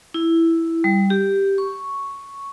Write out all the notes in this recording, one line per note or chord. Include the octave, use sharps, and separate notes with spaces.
E4
G3
G4
C#6